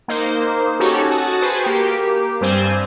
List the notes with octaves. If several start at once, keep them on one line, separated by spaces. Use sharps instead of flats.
A#3 D#4 C5
C#4 D#4 F#4 G4 A4 C#5
F#4 A5 D#6
G#4 B4 C5 C#6
A#3 G4
G2 G3 C4 C5 G#5 D#7